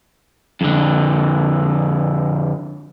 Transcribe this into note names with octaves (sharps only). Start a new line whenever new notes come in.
F2 D3